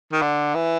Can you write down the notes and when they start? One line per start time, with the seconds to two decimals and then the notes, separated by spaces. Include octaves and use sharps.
0.13 D#3
0.22 D3
0.55 E3